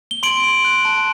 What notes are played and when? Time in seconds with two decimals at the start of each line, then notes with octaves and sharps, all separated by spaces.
0.11 G7
0.23 C6 D7 F#7
0.44 C6
0.65 F#6
0.85 A5